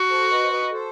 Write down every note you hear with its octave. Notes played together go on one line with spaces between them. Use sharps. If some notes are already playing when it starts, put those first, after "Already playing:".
Already playing: F#4
A4 C5
B4 D#5
C5
B4 D#5
A4 C5